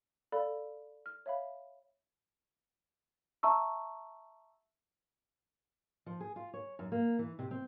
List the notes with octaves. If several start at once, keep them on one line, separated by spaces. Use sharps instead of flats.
A4 D5 F5 B5
F6
C#5 E5 F5 B5
E5 A5 A#5 C#6 E6
F3
G#4
F4
C#5
F#2
A#3
E3
C3
C4